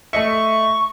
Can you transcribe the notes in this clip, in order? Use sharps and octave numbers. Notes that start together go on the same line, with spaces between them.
A3 D#5 E5 C#6